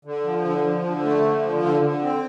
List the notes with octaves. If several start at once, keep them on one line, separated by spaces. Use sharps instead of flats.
D3
F3
D3
F3
D3
A3
D3
F3
D3
D3
C4